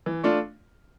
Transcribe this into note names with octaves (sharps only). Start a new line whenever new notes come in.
E3
A3 D4 F4